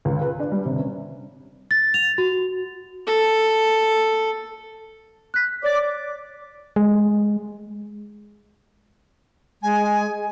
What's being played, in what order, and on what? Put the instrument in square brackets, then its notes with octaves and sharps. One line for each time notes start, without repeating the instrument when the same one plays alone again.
[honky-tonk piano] C#2
B4
D4
G3
C3
C#4
[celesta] A6
F7
F#4
[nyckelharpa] A4
[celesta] F#6 B6
[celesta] C#5 A6 [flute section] D5 D6
[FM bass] G#3
[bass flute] G#3 [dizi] G#5